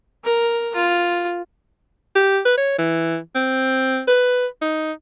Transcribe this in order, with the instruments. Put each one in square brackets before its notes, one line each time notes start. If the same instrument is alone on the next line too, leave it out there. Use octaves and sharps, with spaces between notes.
[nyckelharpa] A#4
F4
[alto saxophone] G4
B4
C#5
E3
C4
B4
D#4